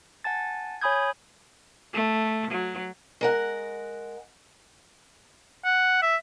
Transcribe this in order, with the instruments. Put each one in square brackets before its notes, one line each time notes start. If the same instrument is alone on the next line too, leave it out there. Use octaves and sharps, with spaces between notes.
[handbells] F#5 G#5 A5 A6
C#5 G#5 B5 D#6 G6 G#6
[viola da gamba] A3
F#3
[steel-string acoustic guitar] G#3 A#4 F#5
[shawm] F#5
E5